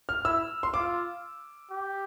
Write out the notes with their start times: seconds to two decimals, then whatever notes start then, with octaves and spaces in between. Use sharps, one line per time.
0.09 F6
0.25 E4 E6
0.63 C6
0.74 F4 D6
1.70 G4